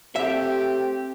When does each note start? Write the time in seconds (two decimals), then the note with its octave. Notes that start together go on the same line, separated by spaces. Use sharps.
0.16 A3 C4 G4 E5